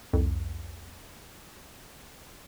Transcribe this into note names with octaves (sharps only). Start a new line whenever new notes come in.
C2 F2